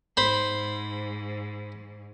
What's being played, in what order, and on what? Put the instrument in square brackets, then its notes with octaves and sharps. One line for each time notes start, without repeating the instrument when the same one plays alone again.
[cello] G#2 [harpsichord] C5 B5